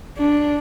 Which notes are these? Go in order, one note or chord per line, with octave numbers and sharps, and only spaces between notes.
D4